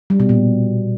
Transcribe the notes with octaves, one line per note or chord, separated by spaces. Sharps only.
G3
B2
A#2